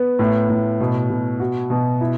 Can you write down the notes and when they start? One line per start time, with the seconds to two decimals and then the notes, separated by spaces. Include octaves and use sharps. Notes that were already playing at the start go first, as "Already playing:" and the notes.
Already playing: B3
0.19 A2
0.49 A2
0.81 B2
1.10 B2
1.40 F#4
1.70 B2
2.01 E4